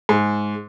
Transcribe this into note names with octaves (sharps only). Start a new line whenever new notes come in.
G#2